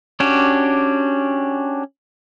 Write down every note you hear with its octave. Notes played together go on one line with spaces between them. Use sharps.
C#4 D4 F#4 G4